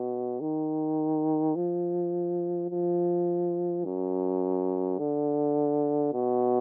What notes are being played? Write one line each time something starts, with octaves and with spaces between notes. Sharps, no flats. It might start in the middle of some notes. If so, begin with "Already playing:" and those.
Already playing: B2
D#3
F3
F3
F#2
D3
B2